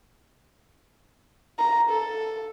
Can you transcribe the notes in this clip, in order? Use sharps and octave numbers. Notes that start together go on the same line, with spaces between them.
A#5
A4